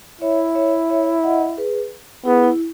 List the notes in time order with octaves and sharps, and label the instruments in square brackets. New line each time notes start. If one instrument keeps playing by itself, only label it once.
[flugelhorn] E4 [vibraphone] C#5 E5
[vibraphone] C#5 E5
C#5 E5
D#5 F#5
G#4 B4
[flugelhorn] B3 [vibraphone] E4 G#4
[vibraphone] E4